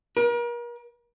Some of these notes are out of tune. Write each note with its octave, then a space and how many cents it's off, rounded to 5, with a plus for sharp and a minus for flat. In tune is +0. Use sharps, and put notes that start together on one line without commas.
A#4 +40